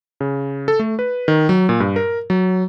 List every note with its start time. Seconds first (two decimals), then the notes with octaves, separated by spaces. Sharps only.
0.21 C#3
0.68 A4
0.79 A3
0.99 B4
1.28 D#3
1.49 F#3
1.69 A#2
1.80 G2
1.96 A#4
2.30 F#3